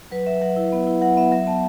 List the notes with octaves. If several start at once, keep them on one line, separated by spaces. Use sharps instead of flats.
F#3 B4
F#3 E5
F#3 F#5
E4
B3
E4
F#3 F#5
B3 E5
F#3 E5
B3 A5